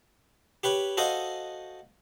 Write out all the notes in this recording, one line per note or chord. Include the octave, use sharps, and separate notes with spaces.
G4 B4 C#5
F#4 A4 C5 D#5 F5